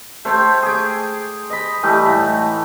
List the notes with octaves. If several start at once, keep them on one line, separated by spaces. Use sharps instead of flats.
A3 C5 C#5 G5
G#4 D6
D#5 B5
E3 G3 A3 D#4
A2